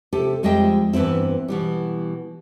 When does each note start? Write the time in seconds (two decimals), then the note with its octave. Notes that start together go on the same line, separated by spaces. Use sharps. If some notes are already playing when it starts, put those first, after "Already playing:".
0.13 C3 G4 A4
0.43 F2 G3 G#3 D#5 E5 G5
0.93 G2 E3 B3 C4 E4
1.48 B2 E3 G3